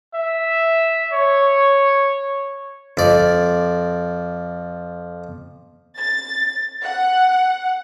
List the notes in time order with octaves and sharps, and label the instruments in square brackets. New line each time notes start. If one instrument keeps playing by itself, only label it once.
[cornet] E5
C#5
[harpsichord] F2 D5
[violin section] A6
F#5